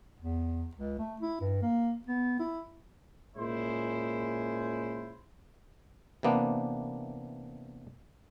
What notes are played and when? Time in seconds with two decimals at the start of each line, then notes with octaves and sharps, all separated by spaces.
0.20 E2
0.75 C#2
0.99 A3
1.21 E4
1.40 G2
1.62 A#3
2.07 B3
2.39 E4
3.37 A#2 G#3 C#4 E4 C5
6.23 C3 E3 A#3 B3 D4